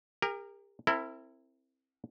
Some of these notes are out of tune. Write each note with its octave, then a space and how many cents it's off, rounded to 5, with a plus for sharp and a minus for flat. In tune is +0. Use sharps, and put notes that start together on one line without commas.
G4 +40 A#4 -10
C4 +15 E4 +0 A#4 -40